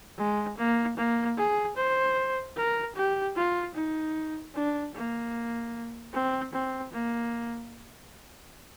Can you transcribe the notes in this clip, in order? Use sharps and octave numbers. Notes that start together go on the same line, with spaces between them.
G#3
A#3
A#3
G#4
C5
A#4
G4
F4
D#4
D4
A#3
C4
C4
A#3